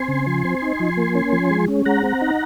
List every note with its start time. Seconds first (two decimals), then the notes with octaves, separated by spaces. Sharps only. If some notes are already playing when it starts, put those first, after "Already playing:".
Already playing: C4 G#5 C6
0.08 C#3
0.27 F3
0.45 C4
0.62 D#4
0.80 F3
0.97 A#3
1.15 C#4
1.33 F3
1.51 G#3
1.68 C#4
1.86 G#3 F#5 A#5
2.04 C4
2.22 D#4